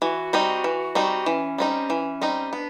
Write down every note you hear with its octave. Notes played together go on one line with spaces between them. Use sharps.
E3 F#4
G3 C4 D#4
E3
G3 C4 D#4
E3 C#4
G3 C4 D#4
E3
G3 C4 D#4
B3 D4